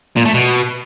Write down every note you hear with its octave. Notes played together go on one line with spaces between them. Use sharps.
A#2
A3
B2